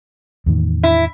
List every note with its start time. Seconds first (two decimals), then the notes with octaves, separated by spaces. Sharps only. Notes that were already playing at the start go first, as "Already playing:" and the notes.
0.46 E2 A2 D#3
0.83 E4